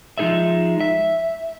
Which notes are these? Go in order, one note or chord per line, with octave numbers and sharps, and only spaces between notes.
F3 G#3 D#4 G#4 D5 E5
E5